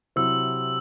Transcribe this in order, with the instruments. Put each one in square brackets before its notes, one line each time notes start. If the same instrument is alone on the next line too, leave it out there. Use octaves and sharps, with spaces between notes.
[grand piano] C3 F#3 C4 E4 [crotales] E6